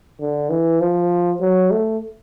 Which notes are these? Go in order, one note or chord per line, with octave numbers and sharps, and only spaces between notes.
D3
E3
F3
F#3
A3